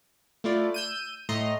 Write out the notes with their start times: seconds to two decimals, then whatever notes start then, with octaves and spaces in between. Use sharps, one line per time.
0.44 A3 E4 F4 D5
0.74 E6 G6 D#7
1.29 A2 A3 D#5 A#5 C6